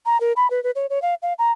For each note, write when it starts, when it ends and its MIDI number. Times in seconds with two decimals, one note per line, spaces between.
0.06 0.20 82
0.20 0.33 70
0.36 0.50 83
0.50 0.62 71
0.64 0.71 71
0.75 0.86 73
0.90 1.01 73
1.02 1.15 77
1.22 1.33 77
1.39 1.52 82